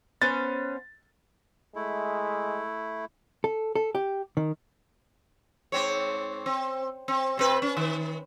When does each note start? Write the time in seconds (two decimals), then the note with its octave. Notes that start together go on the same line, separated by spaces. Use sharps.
0.22 B3 C#4 C5 A6
1.76 G#3 A3 E4
3.44 A4
3.75 A4
3.95 G4
4.37 D#3
5.72 G#2 C4 C#5
6.46 C4
7.08 C4
7.37 C3 C4 B4
7.62 C#4
7.77 D#3